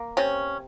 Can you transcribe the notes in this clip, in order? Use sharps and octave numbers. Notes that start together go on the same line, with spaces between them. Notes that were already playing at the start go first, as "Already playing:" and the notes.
Already playing: A#3
C3 C#4